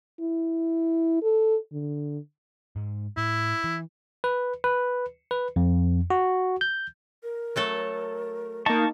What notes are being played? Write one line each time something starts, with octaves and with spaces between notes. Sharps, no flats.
E4
A4
D3
G#2 G#3
A2 E4
E3
B4
B4
B4
F2
F#4
G6
A#4
F#3 A3 A4
A#3 D#4 F5 A5 C#6